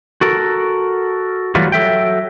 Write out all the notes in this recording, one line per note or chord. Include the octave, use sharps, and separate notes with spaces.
F#4 A4 A#4
E3 F#3 G3 A3 F4 F#4
F#3 A4 E5 G5